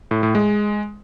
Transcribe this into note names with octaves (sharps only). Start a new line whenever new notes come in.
A2
A2
G#3